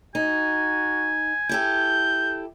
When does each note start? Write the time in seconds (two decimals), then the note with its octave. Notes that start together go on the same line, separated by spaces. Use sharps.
0.15 D#4 F#4 G#5
1.49 E4 G4 A4 G6